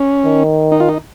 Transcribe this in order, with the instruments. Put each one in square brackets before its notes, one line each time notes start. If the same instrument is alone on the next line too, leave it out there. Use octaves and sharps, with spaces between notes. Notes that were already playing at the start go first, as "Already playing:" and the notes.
Already playing: [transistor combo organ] C#4
[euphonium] D#3
[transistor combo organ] D#4
F4
D#4